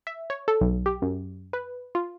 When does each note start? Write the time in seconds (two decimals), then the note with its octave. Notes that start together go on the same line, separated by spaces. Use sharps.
0.07 E5
0.30 C#5
0.48 A4
0.61 B1
0.86 G4
1.02 F#2
1.53 B4
1.95 F4